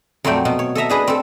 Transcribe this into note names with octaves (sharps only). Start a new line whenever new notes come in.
F2 A#2 F#3 A3 G5
B2
C#5
A4 D#5 E5 A#5
D4 G#4 B4 D#5
C4 A4